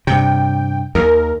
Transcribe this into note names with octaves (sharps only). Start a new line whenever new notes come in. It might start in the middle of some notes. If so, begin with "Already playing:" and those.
G2 C3 G5
D#2 A#4